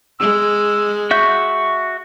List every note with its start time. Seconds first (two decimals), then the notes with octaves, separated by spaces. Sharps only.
0.20 G#3 E6
1.11 F#4 E5 C#6 G6